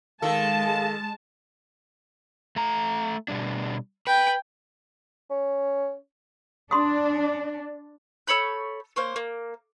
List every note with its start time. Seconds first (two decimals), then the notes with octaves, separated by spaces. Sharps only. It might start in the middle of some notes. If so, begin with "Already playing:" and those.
0.22 D#3 G#3 A4 F5 A5
2.56 A3 A#5
3.28 B2 G3 D4
4.07 B4 G5
5.30 C#4
6.71 D4 C6 D#6
8.27 A4 C#5 B5 G6
8.96 A#3 C5 C#5
9.16 A#3